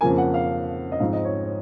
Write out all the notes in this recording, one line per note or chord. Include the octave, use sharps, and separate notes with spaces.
F2 C#3 F3 A#3 G#5
F#5
F5
D#5
G#2 F3 C4 F5
D#5
C#5
C#5